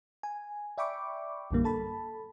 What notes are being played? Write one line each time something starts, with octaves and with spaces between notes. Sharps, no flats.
G#5
D5 E5 G5 B5 C#6 D6
A#1 F#2 D3 G3 A#3
A4 A5 B5